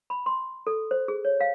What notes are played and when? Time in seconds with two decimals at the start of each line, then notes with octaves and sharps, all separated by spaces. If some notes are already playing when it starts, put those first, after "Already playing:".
0.10 B5
0.26 C6
0.67 A4
0.91 C5
1.08 G#4
1.25 C#5
1.40 F5